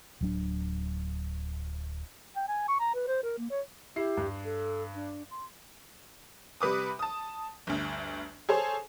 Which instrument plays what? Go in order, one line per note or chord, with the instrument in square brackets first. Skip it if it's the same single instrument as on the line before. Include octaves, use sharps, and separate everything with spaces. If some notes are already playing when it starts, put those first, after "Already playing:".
[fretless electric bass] D1 F#3 D4
[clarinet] G5
G#5
C#6
A#5
B4
C5
A#4
A#3
C#5
[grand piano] E4 C7 [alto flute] G4
[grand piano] G2
[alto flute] A4
D4
C6
[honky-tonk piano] C3 G3 B4 D6 D#6
A5 D#6
G1 D2
G#4 A4 C5 C#5